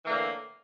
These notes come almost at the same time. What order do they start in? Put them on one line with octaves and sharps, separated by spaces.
E3 A#3 D3 A2